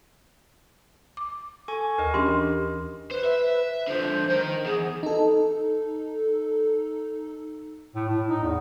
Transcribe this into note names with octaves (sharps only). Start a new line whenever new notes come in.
D6
A4 G#5 C#6
D#2 A#4 D#5
E3 C#4 D4 G4 C6
B4 C5
E5
D3 F3 C5
D#4 A#4
E2 G#4
D#4 A4
A2
A2
D#4
E2